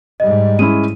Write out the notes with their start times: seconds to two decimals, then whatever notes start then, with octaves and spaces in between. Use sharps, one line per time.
0.20 G#2 G3 D#5
0.59 G#3 C#4 E4 D#7